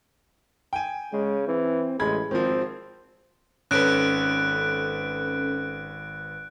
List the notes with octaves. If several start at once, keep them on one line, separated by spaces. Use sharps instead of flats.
G5 G#5
C#3 G#3
E3 C4
A1 G#3 B5 G#6
G#1 D#3 F3 C4
G#1 C#4 A4 B4 F#6 D7